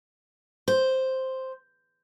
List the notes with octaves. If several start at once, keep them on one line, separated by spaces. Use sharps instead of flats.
C5